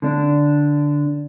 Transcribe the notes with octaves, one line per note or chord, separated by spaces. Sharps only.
D3 D4